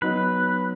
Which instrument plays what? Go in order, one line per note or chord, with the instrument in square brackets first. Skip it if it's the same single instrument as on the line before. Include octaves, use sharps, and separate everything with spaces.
[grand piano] F#3 B3 D#4 [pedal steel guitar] B4